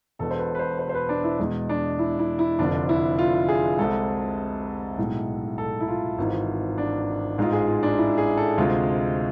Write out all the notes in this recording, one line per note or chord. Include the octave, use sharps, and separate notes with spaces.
E1 E2 B2 A4
C5
B4
B4
C5
C5
C5
B4
D4
E4
E2 B2 G#3
D4
E4
E4
E4
F1 F2 D3 D4
E4
F4
G#4
C2 C3 G#3 A4
B1 A2 G#3
A4
E4
F4
G#1 G#2 E3
D4
A1 G#2 G#3 F4
G#4
F4
D4
E4
G#4
A4
D2 C3 G#3 F4